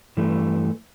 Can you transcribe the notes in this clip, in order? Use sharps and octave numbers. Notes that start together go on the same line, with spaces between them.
G2 E3 A3